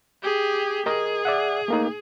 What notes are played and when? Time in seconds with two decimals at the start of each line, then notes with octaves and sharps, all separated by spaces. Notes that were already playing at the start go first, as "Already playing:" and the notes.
0.22 G4 G#4
0.86 G#4 A#4 D#5
1.25 D5 E5 F#5
1.68 A3 A#3 D#4